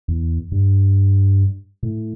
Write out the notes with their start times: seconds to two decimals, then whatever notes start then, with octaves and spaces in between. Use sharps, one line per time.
0.08 E2
0.52 G2
1.83 A2